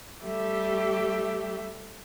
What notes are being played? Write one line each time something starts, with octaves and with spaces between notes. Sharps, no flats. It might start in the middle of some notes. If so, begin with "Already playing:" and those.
G3 A3 G4 E5